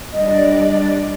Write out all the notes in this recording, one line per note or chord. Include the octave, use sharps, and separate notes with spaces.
G3 D4 D5 D#5